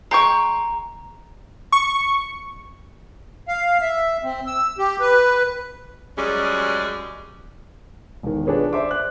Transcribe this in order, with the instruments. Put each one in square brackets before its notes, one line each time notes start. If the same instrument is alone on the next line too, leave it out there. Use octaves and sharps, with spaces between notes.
[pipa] G#3 G5 C#6 [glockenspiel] A#5
[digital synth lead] C#6
[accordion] F5
E5
C4
E6
G4
B4
[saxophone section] F#2 G3 G#3 C#4 G#4
[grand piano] E1 D#3
D4 F4 G4 G#4 B4 C#5
C5 D5 E5 C6 D6
F#6